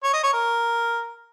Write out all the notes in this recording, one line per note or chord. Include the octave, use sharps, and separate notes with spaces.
C#5
D#5
C#5
A#4